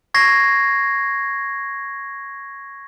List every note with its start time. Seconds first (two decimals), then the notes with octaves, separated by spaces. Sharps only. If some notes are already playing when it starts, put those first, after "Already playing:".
0.14 C#6 G#6 A#6 C7